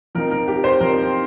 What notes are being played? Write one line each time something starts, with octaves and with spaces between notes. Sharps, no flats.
F3 C4 D#4 A#4
A#4
G4
C5
F3 C4 D#4 A#4